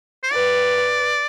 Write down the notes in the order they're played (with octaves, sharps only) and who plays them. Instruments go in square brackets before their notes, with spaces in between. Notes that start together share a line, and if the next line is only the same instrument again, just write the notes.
[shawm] C5
[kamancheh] B4 [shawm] D5